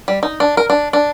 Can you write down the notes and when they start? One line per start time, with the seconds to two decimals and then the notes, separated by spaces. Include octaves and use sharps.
0.08 G3
0.23 D#4
0.40 D4
0.57 A#4
0.70 D4
0.93 D4